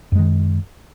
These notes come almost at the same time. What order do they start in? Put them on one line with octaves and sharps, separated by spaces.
F#2 G#3 D#3